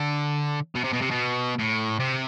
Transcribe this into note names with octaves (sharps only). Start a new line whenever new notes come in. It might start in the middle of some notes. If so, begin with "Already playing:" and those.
Already playing: D3
B2
C3
B2
C3
B2
A2
C3